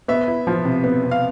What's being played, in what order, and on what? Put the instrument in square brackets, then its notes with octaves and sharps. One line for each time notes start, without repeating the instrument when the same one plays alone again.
[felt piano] B3 [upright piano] E5
[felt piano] E4
F3
C3
B3
C3
[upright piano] F5